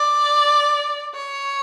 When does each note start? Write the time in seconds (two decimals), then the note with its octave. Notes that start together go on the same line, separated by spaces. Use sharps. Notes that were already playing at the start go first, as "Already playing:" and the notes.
Already playing: D5
1.15 C#5